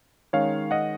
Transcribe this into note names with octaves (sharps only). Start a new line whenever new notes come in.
D#3 G#3 C#4 C#5 F5
D#5 F#5